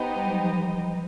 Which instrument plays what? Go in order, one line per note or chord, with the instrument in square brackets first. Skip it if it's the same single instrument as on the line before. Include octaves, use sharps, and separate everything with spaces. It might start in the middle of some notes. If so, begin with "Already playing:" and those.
Already playing: [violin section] B3 D#4 G4 C5 D#5
[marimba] G3
F#3
F3
E3
F3